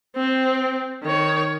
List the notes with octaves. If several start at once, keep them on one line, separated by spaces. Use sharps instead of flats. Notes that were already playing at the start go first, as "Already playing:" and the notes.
C4
D#3 C#5